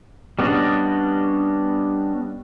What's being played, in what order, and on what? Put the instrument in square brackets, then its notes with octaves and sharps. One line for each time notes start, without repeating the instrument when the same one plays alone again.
[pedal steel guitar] G3 B3 C#4 D4 D#5